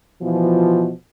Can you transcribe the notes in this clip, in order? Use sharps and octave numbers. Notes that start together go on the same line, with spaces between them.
B2 E3 F3